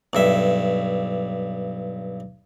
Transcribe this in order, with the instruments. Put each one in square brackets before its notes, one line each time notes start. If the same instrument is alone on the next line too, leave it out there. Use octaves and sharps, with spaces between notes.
[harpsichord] B1 G2 E5